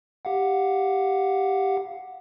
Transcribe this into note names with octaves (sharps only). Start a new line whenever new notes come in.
G4 F5 F#5